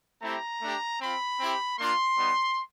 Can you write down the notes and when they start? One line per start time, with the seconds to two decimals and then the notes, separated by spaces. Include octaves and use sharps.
0.23 A3 C4 E4 G4 A#5
0.62 A3 D4 G4
1.01 C4 F4 B5
1.40 C4 E4 G4
1.79 A#3 D4 F4 C6
2.18 G3 B3 D#4